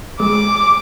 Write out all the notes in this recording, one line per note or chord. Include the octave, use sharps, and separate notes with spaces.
G#3 D6